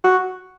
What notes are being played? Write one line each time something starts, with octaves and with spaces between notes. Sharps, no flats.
F#4